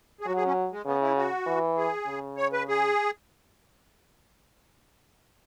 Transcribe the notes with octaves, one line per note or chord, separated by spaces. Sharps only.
G#4
F#3 F#4
G#4
C#4
G#3
C#3 B3
E4
F#4
E3
G#4
C#3
C#5
B4
G#4